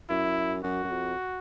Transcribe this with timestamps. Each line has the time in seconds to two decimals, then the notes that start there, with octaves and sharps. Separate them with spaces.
0.10 F#2 E4
0.64 F#2 F#4
0.84 F#2
0.91 F2